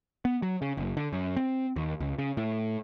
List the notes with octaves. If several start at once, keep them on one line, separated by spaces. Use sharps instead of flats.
B3
F#3
C#3
F#1
D3
F#2
C4
D#2
C#2
C#3
A2